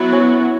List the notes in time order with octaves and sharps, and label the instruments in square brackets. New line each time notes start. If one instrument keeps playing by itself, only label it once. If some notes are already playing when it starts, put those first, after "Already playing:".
Already playing: [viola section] F#3 B3 F#4 [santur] E4 E5
[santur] C#4 C#5